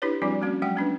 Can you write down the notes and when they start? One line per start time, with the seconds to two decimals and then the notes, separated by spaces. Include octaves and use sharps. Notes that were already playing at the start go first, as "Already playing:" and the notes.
0.02 D4 E4 G4 B4 C#5
0.22 F3 G3 C4 D4 E4 F#4
0.42 A3 A#3 C#4 F#4
0.62 F#3 G#3 F#5 G5
0.76 A#3 C#4 D4 B4